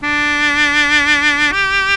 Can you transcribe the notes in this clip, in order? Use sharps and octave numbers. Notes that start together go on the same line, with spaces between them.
D4
G4